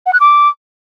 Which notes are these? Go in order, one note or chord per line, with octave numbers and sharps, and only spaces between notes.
F#5
F#6
D6